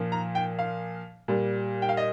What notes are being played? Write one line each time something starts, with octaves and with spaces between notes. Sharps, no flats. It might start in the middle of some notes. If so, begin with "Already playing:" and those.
Already playing: A#2 F3
A#5
G5
F5
A#2 G3
G5
F5
D#5